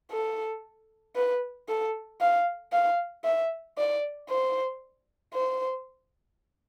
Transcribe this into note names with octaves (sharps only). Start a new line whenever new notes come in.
A4
B4
A4
F5
F5
E5
D5
C5
C5